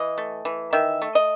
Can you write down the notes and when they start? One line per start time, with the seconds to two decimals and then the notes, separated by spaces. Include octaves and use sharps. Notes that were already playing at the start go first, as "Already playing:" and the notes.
Already playing: E3 D#5
0.18 A3
0.45 E3
0.73 D#3 E5
1.02 A3
1.15 D#5